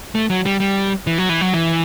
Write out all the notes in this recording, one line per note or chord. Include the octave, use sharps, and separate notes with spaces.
A3
F#3
G3
G3
E3
F#3
E3
F#3
E3